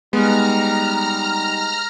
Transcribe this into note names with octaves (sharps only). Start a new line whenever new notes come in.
G3 G#3 B3 D#4 A#5 F6